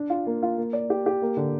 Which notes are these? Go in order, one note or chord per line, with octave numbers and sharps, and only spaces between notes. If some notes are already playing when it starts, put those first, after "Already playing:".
Already playing: D4
F4
A#3
F4
A#3
D5
G4
G4
A#3
D3